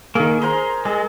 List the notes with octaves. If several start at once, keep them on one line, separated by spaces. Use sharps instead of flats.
D#3 A#3 G#4
A#4 C5 A#5 C6
G#3 G#4